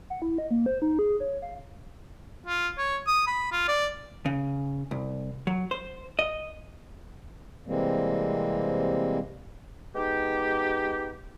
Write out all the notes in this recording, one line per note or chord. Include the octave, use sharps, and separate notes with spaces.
F#5
E4
D#5
A#3
C5
D#4
G#4
C#5
F5
F4
C#5
D#6
B5
F4
D5
C#3
C2
F#3
C5
D#5
C3 E3 G3 G#3 A#3 C4
G#3 B3 D#4 G4